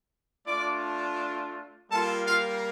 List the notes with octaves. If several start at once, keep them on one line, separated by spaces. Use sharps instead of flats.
A3 D4 F4 D5 D6
G3 A#3 F4 A4 A5
F4 F5